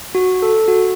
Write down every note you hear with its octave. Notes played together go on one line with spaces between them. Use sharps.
F#4
A4
F#4